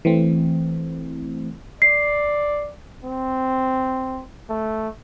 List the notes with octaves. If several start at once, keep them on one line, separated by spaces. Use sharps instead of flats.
E3 A3 C4
D5 C7
C4
A3